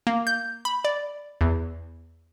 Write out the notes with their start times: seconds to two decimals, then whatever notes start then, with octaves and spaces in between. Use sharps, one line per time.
0.07 A#3
0.27 G6
0.65 B5
0.85 D5
1.41 E2